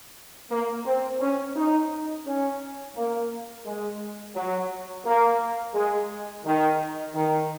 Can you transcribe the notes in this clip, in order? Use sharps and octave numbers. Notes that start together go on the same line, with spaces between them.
A#3
C4
C#4
D#4
C#4
A#3
G#3
F#3
A#3
G#3
D#3
D#3